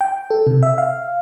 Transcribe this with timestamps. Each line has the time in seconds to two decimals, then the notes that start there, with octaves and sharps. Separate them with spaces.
0.01 G5
0.31 A4
0.47 C3
0.63 E5
0.78 F5